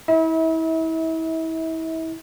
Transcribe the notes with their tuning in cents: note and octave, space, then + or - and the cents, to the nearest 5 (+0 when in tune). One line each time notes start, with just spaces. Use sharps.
E4 -30 E5 -40